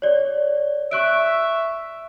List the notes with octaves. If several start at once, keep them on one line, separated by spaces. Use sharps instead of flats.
C#5 D5
E5 C#6 F#6 D7